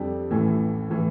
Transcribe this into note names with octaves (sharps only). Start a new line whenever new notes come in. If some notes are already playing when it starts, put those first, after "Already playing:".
Already playing: F2 D3 G3 D4 A4
A1 A2 E3
A2 E3